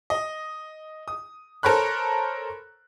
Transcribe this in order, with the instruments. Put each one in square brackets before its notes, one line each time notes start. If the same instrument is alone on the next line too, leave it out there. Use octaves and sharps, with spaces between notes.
[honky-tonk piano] D#5
D#6
A4 A#4 C5 C#5 B5 F#6